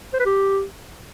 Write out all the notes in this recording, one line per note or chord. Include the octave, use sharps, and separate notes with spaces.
C5
B4
G4